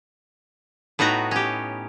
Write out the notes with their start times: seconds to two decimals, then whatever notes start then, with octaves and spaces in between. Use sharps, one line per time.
0.99 A2 B3 D#4 F#4 A#5
1.31 C#4 G4